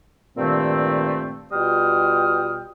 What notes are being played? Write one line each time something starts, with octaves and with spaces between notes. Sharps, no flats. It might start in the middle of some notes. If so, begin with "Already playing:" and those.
G2 A#2 D#3 A3 C4
B2 G3 F4 G5 D#6 F6